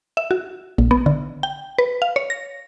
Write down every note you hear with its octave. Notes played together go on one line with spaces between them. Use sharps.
E5
F#4
A#1
B3
D3
G5
B4
F5
C#5
A#6